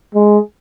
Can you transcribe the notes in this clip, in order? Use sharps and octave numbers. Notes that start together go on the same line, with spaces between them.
G#3